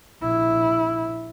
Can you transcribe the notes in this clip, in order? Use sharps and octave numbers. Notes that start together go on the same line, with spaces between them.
A#1 E4